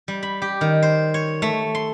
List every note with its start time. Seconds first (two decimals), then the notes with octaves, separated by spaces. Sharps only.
0.08 G3
0.23 B5
0.42 G4
0.61 D#3
0.82 C5
1.14 C#5
1.42 A3
1.75 C6